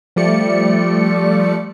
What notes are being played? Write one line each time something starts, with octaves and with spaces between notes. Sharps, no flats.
F3 G3 A3 D5 C#7